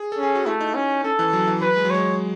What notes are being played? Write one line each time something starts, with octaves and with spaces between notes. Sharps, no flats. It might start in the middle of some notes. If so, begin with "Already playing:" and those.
Already playing: G#4
A4
C#4
G#4
F#4
A3 E4
D#4
C#4
C#4 A4
E3
F#3
E3
F#3 B4
G#3
F#3
G#3 C#5